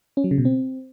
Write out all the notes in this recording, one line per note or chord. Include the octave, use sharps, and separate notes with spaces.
C#4
F#3
C#3
B2
C4